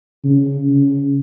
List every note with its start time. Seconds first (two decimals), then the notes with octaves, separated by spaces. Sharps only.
0.24 C#3
0.69 C#3